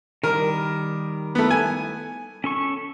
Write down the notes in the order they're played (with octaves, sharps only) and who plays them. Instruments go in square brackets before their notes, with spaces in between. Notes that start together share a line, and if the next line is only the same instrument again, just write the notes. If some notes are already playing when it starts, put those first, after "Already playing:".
[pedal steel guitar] D#3 G3 [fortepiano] A#4
[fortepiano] A3 B3
G#5
[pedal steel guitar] C#4 A4 C#6